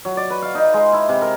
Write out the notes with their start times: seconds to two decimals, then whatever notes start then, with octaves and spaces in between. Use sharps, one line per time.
0.05 F#3
0.17 D5
0.30 B4
0.42 F5
0.55 D#4
0.74 G#3
0.93 E4
1.09 C3
1.22 A#4